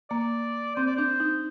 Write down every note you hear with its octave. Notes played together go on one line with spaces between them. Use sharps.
A#3 D5
C4 C5
D5
D4 C5
D#4